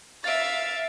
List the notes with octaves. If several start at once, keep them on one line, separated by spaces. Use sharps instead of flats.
E5 F5 A6 D7